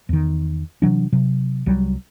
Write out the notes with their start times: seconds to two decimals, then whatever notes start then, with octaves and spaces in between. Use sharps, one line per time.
0.09 E2 D#3
0.82 C3 E3 F#3 D4
1.12 C3 F#3
1.66 C2 F#3 G3